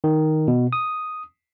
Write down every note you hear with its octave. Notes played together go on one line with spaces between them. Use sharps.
D#3
B2
D#6